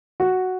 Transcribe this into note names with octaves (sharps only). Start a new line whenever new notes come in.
F#4